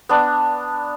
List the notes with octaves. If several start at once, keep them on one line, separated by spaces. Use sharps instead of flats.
B3 D4